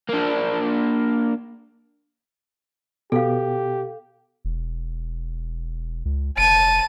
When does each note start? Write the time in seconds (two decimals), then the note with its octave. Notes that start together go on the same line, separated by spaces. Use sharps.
0.09 A#3 D4
3.12 B2 G4 A4 F5
4.45 E1
6.05 C#2
6.37 F1 A5 D#7